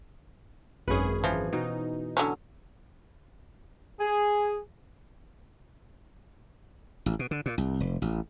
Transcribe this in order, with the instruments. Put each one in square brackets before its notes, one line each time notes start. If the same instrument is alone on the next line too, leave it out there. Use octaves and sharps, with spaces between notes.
[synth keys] G#1 F#2 G#4 [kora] C#4 B4
[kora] E3 [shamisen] F3
[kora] B2 [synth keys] D#4
[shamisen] D3 F#3 C#4
[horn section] G#4
[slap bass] A1
B2
D3
A#2
C2
F1
A1